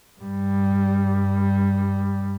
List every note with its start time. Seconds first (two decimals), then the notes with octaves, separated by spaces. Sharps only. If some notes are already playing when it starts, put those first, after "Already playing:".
0.20 G2 G3